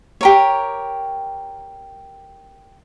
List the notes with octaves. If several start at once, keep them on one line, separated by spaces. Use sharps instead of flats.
G4 A#4 C#5